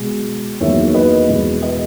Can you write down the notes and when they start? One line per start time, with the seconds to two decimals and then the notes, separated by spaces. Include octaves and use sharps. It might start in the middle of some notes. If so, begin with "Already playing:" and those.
Already playing: B2 G#3
0.61 E2 D#3 F#3 A#3 C#5 E5
0.94 B4 D#5
1.29 E2 B2 G#3
1.62 B4 D#5